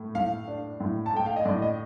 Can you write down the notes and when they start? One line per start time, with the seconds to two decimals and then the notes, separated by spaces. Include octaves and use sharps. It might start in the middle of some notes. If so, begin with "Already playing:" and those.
Already playing: A2 A3
0.15 A2 F5
0.48 D4
0.80 A2
1.06 A5
1.13 A3 G5
1.26 F5
1.36 D#5
1.45 A2 D5
1.62 D#5